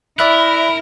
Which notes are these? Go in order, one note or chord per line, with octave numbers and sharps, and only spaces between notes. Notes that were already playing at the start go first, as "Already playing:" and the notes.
E4 A#4 D5 E5 B5 F#6